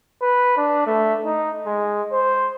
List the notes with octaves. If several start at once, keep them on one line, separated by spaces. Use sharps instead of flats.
B4
D4
A3
D#4
G#3
C5